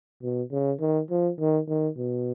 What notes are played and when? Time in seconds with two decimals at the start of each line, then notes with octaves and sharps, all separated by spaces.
0.22 B2
0.52 C#3
0.80 D#3
1.10 F3
1.40 D#3
1.68 D#3
1.97 B2